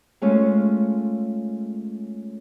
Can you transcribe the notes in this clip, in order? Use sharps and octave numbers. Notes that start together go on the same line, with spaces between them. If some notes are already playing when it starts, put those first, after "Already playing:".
G#3 A3 C#4 F4